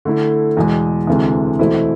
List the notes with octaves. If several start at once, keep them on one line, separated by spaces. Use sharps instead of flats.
D3 A3 E4
E2 B2 G#3
D2 C3 E3 G#3
E2 B2 A3 C4 E4